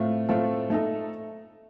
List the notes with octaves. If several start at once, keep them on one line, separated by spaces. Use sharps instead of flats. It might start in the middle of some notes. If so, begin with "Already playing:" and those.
Already playing: A2 A3 C4 F4
A2 A3 C4 F4 A4
A3 D#4 A4